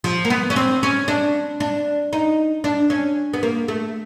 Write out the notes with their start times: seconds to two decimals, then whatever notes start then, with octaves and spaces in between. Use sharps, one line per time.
0.04 F3
0.25 A#3
0.30 B3
0.50 C#4
0.56 C4
0.83 C#4
1.08 D4
1.60 D4
2.13 D#4
2.64 D4
2.90 C#4
3.34 B3
3.43 A#3
3.68 A3